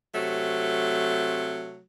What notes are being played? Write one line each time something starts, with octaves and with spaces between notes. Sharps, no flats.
C3 F#3 A3